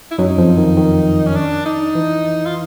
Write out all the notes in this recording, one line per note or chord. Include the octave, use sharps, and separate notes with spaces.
E4
F#2 F#3 D#4
F2 F3
D#3
D#3
C#4
D4
D#4
E3
F4